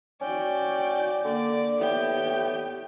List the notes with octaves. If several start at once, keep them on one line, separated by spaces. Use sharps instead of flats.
C#4 F#4 D5 G5
D3 A#3 D5
A2 B3 G4 G5